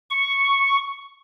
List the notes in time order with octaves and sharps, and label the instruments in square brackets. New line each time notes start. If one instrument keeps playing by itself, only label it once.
[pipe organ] C#6